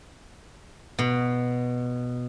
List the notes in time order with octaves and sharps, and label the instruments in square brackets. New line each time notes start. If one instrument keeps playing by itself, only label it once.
[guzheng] B2